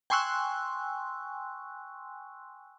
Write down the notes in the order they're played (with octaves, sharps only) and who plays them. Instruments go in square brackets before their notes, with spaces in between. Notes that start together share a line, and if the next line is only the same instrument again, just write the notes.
[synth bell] G5 G#5 C6 C#6 E6 F#6